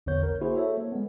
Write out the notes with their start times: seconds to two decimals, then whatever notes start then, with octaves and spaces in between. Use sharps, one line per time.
0.06 A#1 E2 D3 B3 C#5 G6
0.23 A#4
0.41 A#3 E4 F#4 G#4 C5
0.56 A4 C#5 E5
0.78 A#3
0.92 G#3 B3